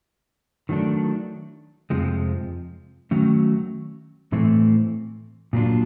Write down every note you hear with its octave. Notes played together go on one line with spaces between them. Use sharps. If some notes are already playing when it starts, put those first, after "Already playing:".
D#3 F#3 A3 D4
F2 C3 F3 G#3
D#3 F#3 A3 C#4
A2 E3 A3 C4 E4
A#2 F#3 A#3 D4 F4